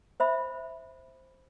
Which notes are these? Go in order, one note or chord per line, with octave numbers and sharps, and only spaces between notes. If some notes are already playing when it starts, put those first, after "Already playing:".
C5 E5 B5